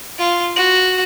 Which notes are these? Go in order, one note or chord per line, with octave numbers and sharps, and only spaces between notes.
F4
F#4